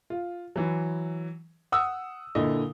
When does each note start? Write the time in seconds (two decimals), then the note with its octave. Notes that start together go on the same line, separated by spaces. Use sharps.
0.10 F4
0.56 E3 F#3
1.72 F#5 D#6 E6
2.35 A#2 D3 E4 D#5